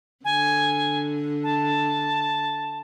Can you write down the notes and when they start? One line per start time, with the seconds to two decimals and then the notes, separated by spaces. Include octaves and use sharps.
0.25 D3 G#5
1.44 A5